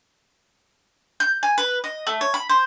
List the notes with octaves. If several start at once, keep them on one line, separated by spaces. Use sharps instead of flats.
G6
G#5
B4
D#5
A3
C#5
B5
C5